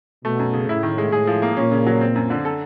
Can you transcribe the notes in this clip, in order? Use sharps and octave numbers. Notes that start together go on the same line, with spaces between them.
B2 A3
F#2
C#3
A2 E4
D#3
G#3
A2 G#4
F3
A#3
A#2 C#4
C#3
F#3
C4
F#2
D3
A4